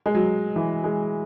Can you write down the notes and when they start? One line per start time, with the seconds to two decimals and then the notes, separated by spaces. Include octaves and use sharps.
0.06 G#3
0.15 F#3
0.56 E3
0.84 G#3